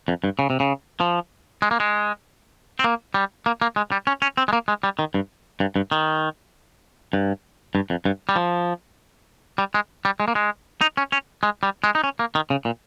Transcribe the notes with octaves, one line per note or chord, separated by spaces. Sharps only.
F2
G2
C#3
C3
C#3
F3
G#3
A#3
G#3
C4
A#3
G3
A#3
A#3
G#3
G3
C#4
C#4
C4
G#3
A#3
G#3
G3
D#3
G2
G2
G2
D#3
G2
G2
F2
G2
G3
F3
G3
G#3
G3
G#3
A#3
G#3
D#4
C#4
C#4
G#3
G3
G#3
D#4
C#4
A#3
D#3
C#3
A#2